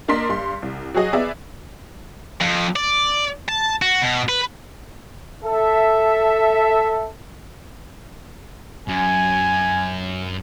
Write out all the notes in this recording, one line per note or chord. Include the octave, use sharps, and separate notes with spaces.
A#3 D4 A#4 D#5 C6 B6
G2 C6
C2
F#3 F#4 G#4 D#5
B3 G#4 D5 E5
F2
D5
A5
F#4
B2
B4
A4 E5
F#2 G#5